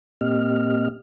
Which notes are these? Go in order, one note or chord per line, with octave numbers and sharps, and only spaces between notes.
A#2 A#3 C4 G4 D#5 F6